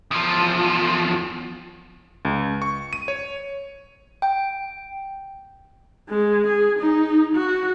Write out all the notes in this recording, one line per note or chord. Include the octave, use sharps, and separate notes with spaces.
E2 F3
C#2
C#6
D#7
C#5
G5
G#3
G#4
D#4
F#4